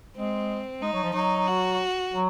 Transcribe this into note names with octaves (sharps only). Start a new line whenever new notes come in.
G#3 C4
G#3 D#4
F#3
F3
F#3 D#4
F#4
F#3